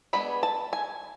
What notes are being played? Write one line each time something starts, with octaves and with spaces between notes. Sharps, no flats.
G#3 B3 D4 B5
A5
G#5